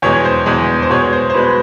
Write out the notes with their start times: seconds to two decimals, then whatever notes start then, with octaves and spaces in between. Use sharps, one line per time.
0.02 E2 B2 G#3 C#5
0.25 C5
0.46 E2 B2 G#3
0.82 C5
0.90 B2 G#3 C#5
1.13 C5
1.30 C5
1.34 B2 G#3 B4